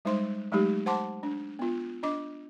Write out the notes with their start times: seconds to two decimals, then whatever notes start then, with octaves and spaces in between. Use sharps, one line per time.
0.05 G3 G#3 D#4 C5 C6
0.52 F#3 G#3 A3 D#4 G4
0.86 C5 F#5 A5 C6 D6
1.23 D4
1.59 B3 F4
2.03 D4 D#5 D6